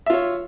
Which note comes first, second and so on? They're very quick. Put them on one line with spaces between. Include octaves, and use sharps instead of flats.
E5 F4 C#5